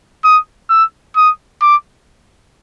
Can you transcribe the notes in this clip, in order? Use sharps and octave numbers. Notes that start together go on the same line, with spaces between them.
D#6
E6
D#6
D6